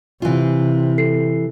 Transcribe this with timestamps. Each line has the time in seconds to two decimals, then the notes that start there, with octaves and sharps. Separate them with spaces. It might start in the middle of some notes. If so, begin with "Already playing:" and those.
0.22 C3 E3 F4
0.98 A4 C7